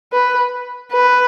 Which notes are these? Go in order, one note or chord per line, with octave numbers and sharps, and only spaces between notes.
B4
B4